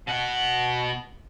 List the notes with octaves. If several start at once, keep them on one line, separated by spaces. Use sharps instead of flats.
B2 F#5